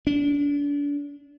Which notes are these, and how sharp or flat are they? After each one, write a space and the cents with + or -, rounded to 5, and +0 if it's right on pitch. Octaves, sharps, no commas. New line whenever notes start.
D4 -35